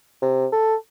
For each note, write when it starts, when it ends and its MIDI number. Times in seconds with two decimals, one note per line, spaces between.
0.22 0.46 48
0.52 0.75 69